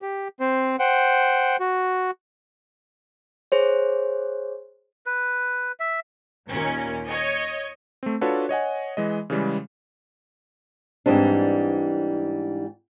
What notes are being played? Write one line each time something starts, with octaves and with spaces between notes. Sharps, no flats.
G4
C4 C5
C5 F#5 G5
F#4
G#4 C5 C#5
B4
E5
D#2 A#2 C#4 A#4
C#5 D#5
A3 C4
D4 F4 F#4 A4 B4 C#5
C#5 D#5 F#5 G#5
E3 G#3 D#5
C#3 E3 G3 G#3
G#2 E3 G3 C4 D4